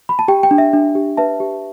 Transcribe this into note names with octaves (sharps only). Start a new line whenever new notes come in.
B5
A5
G4 G5
G5
D4
E5
D4
G4
B4 E5 A5
G4